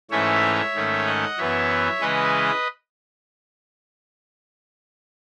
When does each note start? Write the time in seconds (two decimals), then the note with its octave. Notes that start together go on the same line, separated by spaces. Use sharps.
0.11 G#2 E3 A3 C#4 C#5 E5
0.74 G#2 D#3 A3 C#4
1.06 D#5 F#5
1.38 F#2 E3 B3 C#5 E5
2.00 C#3 E3 G#3 C#4 B4 D#5